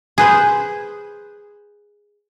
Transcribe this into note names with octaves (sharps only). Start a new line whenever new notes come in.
G#4 B4 C5